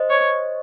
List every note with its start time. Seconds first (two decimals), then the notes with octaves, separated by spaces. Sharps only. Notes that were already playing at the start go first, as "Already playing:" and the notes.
Already playing: C5 D#5
0.10 C#5